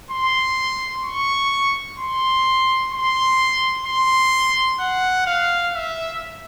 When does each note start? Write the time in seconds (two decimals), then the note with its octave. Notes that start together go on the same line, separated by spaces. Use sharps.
0.11 C6
1.04 C#6
1.98 C6
2.92 C6
3.86 C6
4.80 F#5
5.26 F5
5.74 E5